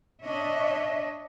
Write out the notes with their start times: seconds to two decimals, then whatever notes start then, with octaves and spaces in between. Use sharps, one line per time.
0.24 D4 C#5 D#5 E5